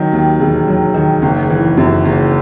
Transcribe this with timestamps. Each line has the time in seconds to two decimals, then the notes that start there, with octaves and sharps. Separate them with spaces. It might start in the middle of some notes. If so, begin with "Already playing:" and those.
Already playing: D#3 F#3
0.12 D#2
0.40 E1
0.68 F#3
0.94 D#3
1.22 F#1
1.50 E3
1.77 F#2
2.05 F#1